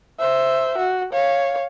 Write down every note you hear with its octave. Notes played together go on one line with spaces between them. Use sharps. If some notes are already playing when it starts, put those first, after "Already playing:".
C5 E5
F#4
C#5 F5